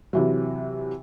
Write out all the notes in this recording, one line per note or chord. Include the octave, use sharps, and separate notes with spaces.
C3 E3 F#3